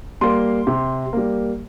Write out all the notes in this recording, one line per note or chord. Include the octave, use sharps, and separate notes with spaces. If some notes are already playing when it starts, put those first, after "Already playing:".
G3 A#3 C6
C3
G3 A#3